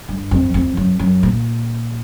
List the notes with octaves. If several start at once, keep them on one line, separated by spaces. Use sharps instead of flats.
G2
F2
F2
F#2
F#2
A#2